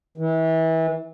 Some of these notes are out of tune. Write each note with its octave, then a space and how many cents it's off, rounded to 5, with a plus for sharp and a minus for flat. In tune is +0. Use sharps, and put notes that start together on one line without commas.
E3 -30